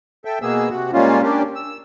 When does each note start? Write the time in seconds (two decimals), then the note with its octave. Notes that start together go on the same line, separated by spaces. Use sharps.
0.25 A4 E5 G5
0.42 B2 A#3 B3 G#4 E6
0.70 C3 F#4
0.93 A#2 G3 G#3 A#3 C#4 F4
1.22 A#3 C#4 D4 G4
1.56 E6